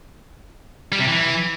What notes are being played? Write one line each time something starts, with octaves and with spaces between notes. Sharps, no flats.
G3
C3
E3